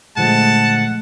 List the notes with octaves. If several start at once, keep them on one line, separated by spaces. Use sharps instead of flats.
A#2 D3 F3 G#3 A3 F#5 A5